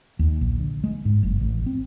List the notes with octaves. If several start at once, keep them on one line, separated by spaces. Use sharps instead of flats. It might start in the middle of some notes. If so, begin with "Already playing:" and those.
D#2
A#1
D3
G#3
G#2
F#1
A1
C4